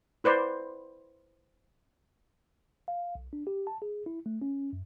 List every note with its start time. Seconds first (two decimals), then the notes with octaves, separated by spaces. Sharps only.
0.24 E4 B4 C5 D5
2.88 F5
3.15 B1
3.33 D4
3.47 G4
3.67 A5
3.82 G#4
4.06 E4
4.26 A3
4.42 C#4
4.73 F#2